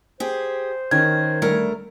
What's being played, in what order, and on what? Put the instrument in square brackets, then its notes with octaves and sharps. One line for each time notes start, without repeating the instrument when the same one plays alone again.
[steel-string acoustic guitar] G4 G#4 [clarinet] C5
[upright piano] D#3 C#4 [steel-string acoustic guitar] A#4 [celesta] G#6
[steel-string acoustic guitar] D2 A3 A#4 [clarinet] G3